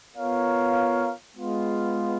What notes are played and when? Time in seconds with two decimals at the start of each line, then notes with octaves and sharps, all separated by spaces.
0.15 B3 F4 A#4 C#5 F5
1.37 G#3 B3 F4